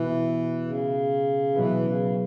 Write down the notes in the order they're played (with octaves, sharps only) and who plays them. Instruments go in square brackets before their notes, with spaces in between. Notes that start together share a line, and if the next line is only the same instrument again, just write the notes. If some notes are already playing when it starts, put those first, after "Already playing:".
Already playing: [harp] B2 B3 F#4 [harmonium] E3
[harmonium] C#3
[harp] B2 F#3 B3 E4 B4 [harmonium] E3
[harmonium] C#3